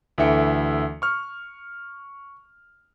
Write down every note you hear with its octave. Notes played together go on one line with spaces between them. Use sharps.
D2 E3 A4 E5 G5 C#7
C#6 F6